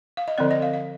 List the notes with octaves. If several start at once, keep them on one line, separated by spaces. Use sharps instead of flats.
F5
D#5
D3 F3 C4 D5
D#5
F5
F5